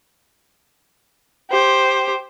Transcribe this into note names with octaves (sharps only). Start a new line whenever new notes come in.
G4 C5